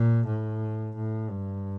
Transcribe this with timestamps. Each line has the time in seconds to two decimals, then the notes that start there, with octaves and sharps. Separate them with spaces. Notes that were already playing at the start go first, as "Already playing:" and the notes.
Already playing: A#2
0.27 A2
0.96 A2
1.30 G2